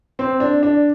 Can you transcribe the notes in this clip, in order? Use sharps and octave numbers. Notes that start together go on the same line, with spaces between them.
C4
D4
D4